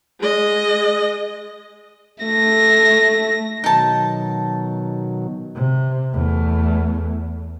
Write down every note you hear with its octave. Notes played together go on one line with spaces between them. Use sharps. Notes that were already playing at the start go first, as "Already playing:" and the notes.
G#3 D#5
A3 A#6
B2 D#3 F#3 D#4 A5
C3
E2 A3